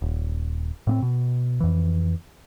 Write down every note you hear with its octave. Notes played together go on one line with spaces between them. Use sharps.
D#1
A2 B3 C4
B2
F2 E3